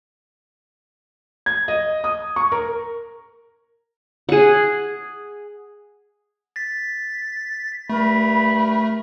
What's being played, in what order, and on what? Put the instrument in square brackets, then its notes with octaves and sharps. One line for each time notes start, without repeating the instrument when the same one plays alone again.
[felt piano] G#6
D#5
D#6
C#6
A#4
[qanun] G#4 F#5
[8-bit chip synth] A6 B6
[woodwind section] G2 A#4 B5 [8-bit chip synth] A3